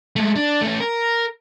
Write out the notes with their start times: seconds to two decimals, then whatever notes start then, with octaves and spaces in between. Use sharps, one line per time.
0.16 G#3 A3
0.36 D4
0.61 A3 C#4
0.80 A#4